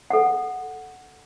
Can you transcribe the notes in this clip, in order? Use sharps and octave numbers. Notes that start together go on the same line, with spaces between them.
A4 F#5